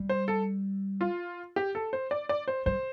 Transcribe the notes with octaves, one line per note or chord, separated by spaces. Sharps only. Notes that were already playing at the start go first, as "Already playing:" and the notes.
Already playing: G3
C5
A4
F4
G4
A4
C5
D5
D5
C5
G3 C5